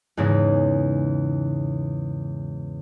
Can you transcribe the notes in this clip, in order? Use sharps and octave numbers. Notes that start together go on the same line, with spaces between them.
E2 G#2 C#3 E3 G#3